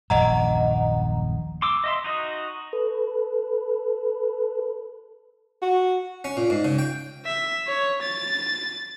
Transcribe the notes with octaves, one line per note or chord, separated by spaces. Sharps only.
D#1 A#1 F#2 D#5 F#5 A#5
C6 D6 E6
D#5 E5 C6
D#4 F#4 D#5
A4 B4
F#4
C#4
A#2
G#2
C#3
G5
E5
C#5
A6